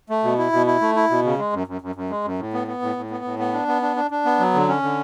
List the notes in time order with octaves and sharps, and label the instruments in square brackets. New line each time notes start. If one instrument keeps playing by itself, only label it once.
[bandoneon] A3
B2
E4
B2
E4
A3
E4
B2
C#3
G#3
F#2
F#2
F#2
F#2
G#3
F#2
A2
B3
B3
A2
A2
B3
A2
B3
D4
B3
D4
D4
D4
B3
F#3
D3
C#4
D3